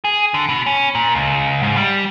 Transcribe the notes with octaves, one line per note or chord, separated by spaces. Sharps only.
G#4
D3
B2
C#4
A#2
C#2
G#2
G3